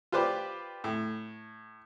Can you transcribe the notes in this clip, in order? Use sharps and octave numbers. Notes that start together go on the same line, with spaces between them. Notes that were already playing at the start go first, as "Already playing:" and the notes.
F4 G4 B4 C5 D5
A2